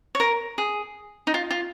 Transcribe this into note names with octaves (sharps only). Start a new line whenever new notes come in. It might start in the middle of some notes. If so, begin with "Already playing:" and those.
C#5
A#4
G#4
D#4
F4
F4